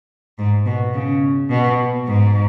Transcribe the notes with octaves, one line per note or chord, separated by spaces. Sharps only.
G#2
B2
C#3
B2
G#2